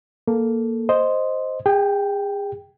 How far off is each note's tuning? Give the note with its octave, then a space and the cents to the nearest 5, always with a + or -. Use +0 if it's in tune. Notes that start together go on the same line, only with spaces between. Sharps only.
A#3 +0 A4 +0
C5 +0 D#5 +0
G#4 -35 G5 +0